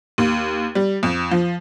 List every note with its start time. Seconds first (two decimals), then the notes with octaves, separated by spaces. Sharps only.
0.18 D#2
0.75 G3
1.03 F2
1.31 F3